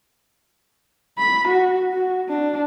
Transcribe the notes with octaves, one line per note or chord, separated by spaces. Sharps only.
B5
F#4
F#4
D4